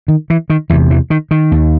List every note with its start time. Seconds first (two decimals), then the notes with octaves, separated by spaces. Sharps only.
0.08 D#3
0.30 E3
0.50 D#3
0.70 E2 E3
0.73 C3
0.91 E3
1.10 D#3
1.31 D#3
1.52 D#2